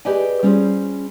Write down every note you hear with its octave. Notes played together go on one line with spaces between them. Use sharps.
G4 G#4 B4 D5 D#5 G#5
G3 C#4 F4 G#4 C5